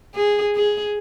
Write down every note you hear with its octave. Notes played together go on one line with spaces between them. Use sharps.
G#4
G#4